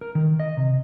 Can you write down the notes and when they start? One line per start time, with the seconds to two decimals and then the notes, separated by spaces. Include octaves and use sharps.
0.01 A#4
0.15 D#3
0.40 D#5
0.57 C3